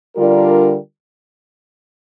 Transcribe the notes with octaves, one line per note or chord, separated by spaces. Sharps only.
D3 G3 D4 F4 A#4